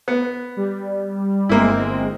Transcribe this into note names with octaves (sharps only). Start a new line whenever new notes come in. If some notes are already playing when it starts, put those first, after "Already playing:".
B3
G3
G1 G#3 A#3 C4 E4